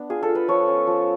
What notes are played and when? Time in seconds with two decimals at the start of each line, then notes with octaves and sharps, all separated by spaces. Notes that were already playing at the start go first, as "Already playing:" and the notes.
Already playing: B3 D4
0.10 F4 G#4
0.23 A4
0.29 F4
0.35 B4
0.48 F3 C#5
0.68 C#4
0.87 F3